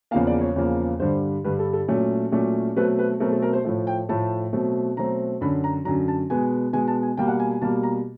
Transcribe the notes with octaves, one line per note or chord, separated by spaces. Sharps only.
E2 C#3 F3 A#3 F5
D5
C#5
E2 C#3 F3 A#3
G2 D3 G3 C5
G2 D3 G3 B4
A4
A4
A#2 F#3 A3 C#4
A#2 F#3 A3 C#4
B2 F#3 A3 C4 B4
B4
B2 F#3 A3 C4 A#4
A4
A#4
C5
A2 F3 A3
G5
A2 F3 A3 A5
B2 F#3 A3 C4
B2 F#3 A3 C4 A#5
F#2 D3 F#3 B5
A#5
F#2 D3 F#3 A#5
A5
B2 G#3 B3 G#5
B2 G#3 B3 G#5
A5
G#5
B2 G3 A#3 G5
F#5
G#5
G#5
B2 G3 A#3 A5
A#5